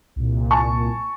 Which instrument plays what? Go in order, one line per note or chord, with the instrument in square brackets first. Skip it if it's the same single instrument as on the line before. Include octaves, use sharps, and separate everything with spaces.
[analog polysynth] C2 A#2
[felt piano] G#5 A5 C#6